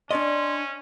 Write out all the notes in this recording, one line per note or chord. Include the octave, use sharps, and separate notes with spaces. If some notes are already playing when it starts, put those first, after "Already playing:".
C#4 D4 D5 D#5 C6